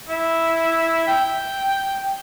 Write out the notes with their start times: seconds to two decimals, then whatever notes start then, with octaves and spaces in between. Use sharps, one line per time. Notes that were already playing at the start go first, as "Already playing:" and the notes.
0.09 E4
1.07 G5